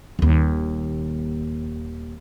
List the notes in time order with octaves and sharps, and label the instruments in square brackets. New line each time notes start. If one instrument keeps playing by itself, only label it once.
[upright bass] D#1 D#2